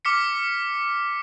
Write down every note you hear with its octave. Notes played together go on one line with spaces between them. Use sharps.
D6 F6 B6 C#7